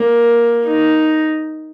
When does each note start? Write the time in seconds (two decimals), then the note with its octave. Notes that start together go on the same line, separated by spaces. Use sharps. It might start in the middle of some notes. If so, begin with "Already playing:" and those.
Already playing: A#3
0.66 D#4